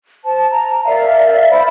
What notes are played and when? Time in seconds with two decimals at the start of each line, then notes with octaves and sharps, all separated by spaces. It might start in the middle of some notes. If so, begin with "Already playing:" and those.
0.24 C5 A5
0.51 A#5
0.86 A#4 D5 E5 F5
1.50 C5 E5 B5